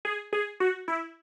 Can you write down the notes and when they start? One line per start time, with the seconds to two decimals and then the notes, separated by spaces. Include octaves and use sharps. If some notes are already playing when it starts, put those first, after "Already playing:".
0.05 G#4
0.33 G#4
0.60 F#4
0.88 E4